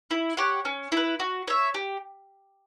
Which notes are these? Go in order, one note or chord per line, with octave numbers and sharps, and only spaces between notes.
E4
G4 C#5 F#5
C#4
E4 B4
F#4
C#5 E5
G4